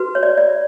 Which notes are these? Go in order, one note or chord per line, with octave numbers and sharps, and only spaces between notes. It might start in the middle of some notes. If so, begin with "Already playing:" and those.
Already playing: F#4 B4
C#5
D5
D5